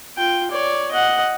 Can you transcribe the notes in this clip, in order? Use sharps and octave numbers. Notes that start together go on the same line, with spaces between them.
F4 G5
C#5 D5
D#5 F#5